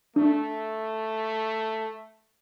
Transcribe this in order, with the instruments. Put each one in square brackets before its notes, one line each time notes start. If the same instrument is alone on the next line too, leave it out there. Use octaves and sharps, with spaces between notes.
[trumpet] A3 [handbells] D4